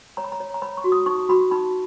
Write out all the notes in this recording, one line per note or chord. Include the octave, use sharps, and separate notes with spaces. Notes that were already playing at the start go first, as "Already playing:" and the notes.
C#5 A#5
B5
A#5
C#5
A#5
C#5 B5
C#6
F#4
D#6
D#4 C#6
F#4 B5
D#4 B5